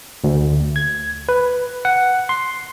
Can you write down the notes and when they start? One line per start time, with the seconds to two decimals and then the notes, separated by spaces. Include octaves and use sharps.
0.24 D2
0.76 G#6
1.29 B4
1.85 F#5
2.29 C6